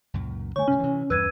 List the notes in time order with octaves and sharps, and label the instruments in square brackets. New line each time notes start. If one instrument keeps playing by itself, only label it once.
[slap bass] C#2 F#2 A#2
[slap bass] D3 A3 [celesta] C#5 G#5 [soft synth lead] C#6
[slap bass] G2 C3 [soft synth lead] C#4
[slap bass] C3 E3
[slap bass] E2 G2 [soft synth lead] B4 [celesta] E6 G#6 D#7